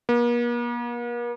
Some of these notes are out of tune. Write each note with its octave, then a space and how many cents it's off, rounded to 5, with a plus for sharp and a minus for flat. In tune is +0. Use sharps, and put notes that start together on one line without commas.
A#3 +45